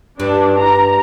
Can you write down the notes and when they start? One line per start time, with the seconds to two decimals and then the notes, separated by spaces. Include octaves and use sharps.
0.20 G2 D4
0.60 A#5